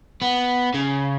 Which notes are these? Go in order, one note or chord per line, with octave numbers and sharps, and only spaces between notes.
B3
C#3